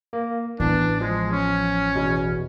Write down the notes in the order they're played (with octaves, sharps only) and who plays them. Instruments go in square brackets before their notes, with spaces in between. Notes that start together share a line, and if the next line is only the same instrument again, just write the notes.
[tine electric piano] A#3
[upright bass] A1 B3 [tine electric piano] E3 [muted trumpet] D4
[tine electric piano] F3 [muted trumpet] G#3
[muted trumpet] C#4
[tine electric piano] E2 B2